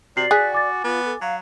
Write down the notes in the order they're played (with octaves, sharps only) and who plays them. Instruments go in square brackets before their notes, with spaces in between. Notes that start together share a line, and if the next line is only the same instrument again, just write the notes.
[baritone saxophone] C3 [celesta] F#4 C7 F#7 [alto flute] D5
[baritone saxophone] F#4 [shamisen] G#4 [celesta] F#6 B6
[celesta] G#5 D6 A6
[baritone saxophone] B3 [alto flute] F4
[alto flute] A4
[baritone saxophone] F#3 [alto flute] F5